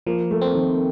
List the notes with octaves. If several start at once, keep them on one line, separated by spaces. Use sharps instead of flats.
F3 A#3
A3
C4
D#3